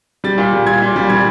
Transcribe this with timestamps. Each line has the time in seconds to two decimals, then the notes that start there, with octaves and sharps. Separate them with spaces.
0.24 G3 A6
0.38 A#2
0.53 G3
0.66 A#2 G#6
0.82 A#2
0.96 G3
1.10 G3 G#6